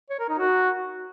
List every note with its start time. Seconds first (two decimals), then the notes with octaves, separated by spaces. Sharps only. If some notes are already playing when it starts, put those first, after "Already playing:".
0.10 C#5
0.19 A#4
0.29 D#4
0.39 F#4